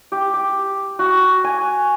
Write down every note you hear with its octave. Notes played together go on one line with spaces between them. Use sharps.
G4
G4
F#4
G#5